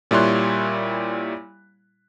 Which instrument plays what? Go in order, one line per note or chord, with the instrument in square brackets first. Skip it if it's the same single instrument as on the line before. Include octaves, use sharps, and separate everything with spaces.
[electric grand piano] A#2 G3 E4 C#5 C6 F#6